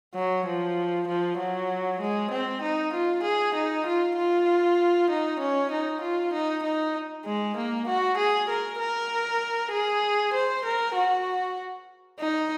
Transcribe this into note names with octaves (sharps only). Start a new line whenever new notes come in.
F#3
F3
F3
F#3
G#3
C4
D#4
F4
G#4
D#4
F4
F4
D#4
C#4
D#4
F4
D#4
D#4
G#3
A#3
F#4
G#4
A#4
A#4
G#4
C5
A#4
F#4
D#4